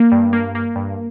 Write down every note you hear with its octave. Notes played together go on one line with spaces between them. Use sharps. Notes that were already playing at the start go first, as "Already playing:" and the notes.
Already playing: A#3
G2
A#3
A#3
G2